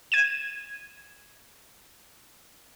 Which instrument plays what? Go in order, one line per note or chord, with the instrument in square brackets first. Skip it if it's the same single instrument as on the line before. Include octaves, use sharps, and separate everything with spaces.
[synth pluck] G#6 D#7 E7